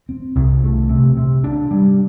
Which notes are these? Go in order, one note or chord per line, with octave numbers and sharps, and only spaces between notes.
C4
C2
A3
C3
C3
D4
G3